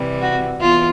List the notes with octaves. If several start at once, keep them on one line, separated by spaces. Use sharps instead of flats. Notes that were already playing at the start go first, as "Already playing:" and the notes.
Already playing: C3 E3 G3
F#4
E2 F4